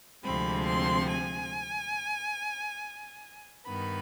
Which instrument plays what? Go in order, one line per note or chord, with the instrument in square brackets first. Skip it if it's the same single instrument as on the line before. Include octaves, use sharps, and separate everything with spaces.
[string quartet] D2 C3 F3 G#3 C4 B5
C6
G#5
G2 D#3 B3 B5